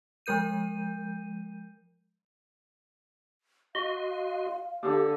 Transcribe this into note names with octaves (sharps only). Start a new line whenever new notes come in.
F3 G#3 A#4 G6 D#7
F#4 D#5 F5 C6
D3 G4